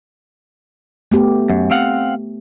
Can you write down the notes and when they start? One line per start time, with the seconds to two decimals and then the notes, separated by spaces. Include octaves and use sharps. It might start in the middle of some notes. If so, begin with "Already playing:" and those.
1.12 A3 B3 G4
1.50 F#2
1.71 C4 F5 F#5